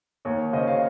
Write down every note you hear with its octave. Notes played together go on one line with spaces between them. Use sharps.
D#2 C#5
C#3 C5 D#5
C#5 F5